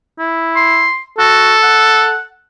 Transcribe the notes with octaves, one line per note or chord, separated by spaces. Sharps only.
E4
C6
F#4 A4
F#5